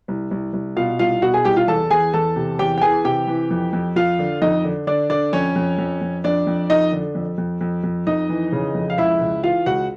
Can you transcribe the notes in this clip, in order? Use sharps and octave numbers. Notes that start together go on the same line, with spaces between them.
C2
C2
C2
B2 F4 F5
C2 F4 F5
B2 F#4 F#5
G#4 G#5
C2 G4 G5
F4 F5
E2 A4 A5
E2 G#4 G#5
E2 A4 A5
C3
E2 G4 G5
G5
E3 G#4 G#5
C3 G4 G5
E3
F2
F2
F2 F4 F5
D3
F2 D#4 D#5
D3
D3 D4 D5
D3 D4 D5
F2 C#4 C#5
F2
F2
F2
F2 D4 D5
F2
F2 D#4 D#5
D3
F2
F2
F2
F2
F2 D#4 D#5
E3
C#3
F2
F5
C#2 E4 E5
C#2
E3 F4 F5
C#2 F#4 F#5